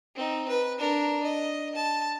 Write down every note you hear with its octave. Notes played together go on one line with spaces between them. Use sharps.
C4 D#4
B4
D4 A#4
D#5
A5